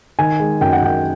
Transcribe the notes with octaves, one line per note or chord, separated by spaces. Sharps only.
D#3 G#5
G#3
F#2 G5
F#5
F#2 G5